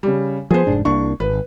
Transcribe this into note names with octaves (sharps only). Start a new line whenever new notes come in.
C#3 G3
F3 B3 G#4 C5
F1 G#2 D4
C2 A#3 D4 C#6
G#1 B4